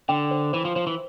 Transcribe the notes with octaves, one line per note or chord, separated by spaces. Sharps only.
D3 G5
C5
E3 C5
F3
F3 C5
E3